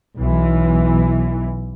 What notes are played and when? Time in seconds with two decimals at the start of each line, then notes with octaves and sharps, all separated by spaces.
0.17 B1 E3